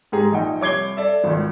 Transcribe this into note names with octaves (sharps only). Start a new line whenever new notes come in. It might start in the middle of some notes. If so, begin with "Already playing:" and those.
G#2 G4 G#4 A#5
A#1 D#4 G5
C2 C#5 D6 G#6 C7 G7
A4 D5 E5
G#1 C#2